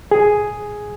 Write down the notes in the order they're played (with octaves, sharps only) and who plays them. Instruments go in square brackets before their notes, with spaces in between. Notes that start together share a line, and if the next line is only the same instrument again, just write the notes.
[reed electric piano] G#4